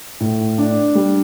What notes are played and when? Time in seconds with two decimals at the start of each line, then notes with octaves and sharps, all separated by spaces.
0.21 A2
0.58 D4
0.95 G3